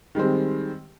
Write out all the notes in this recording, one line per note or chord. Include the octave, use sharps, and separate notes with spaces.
D#3 G3 G#3 C4